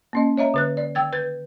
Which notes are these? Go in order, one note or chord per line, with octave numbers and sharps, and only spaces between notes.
A#3 C#4 D#5
C#5 D#5 E5 A#5
D3 B4 F#6
D5
D#3 G5 E6 G#6 A6
B4 G6 G#6